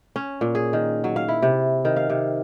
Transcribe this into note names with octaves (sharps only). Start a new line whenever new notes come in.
C#4
A#2
G#4
D#3
F#3
F5
E4
C3
D#3
F5
C3